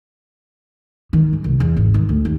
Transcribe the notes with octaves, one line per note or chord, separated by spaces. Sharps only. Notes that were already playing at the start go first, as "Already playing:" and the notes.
D#3
G#2
C2
E2
G#1
D#3
D2
D#2